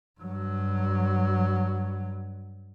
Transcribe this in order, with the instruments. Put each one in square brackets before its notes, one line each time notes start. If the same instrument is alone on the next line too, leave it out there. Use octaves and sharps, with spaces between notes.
[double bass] G2 F#3